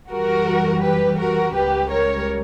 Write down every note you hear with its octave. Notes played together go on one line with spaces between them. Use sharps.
F#2 E3 G3 F#4 A#4
G4 B4
F#4 A#4
C#2 C#3 G3 G4 B4
A#4 C#5